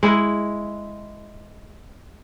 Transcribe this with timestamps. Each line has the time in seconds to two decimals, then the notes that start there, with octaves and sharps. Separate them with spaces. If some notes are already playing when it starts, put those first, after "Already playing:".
0.03 G#3 E4